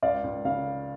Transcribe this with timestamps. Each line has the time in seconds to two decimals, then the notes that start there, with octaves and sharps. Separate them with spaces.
0.02 C#2 D5 F5
0.24 C#2
0.45 C#3 F5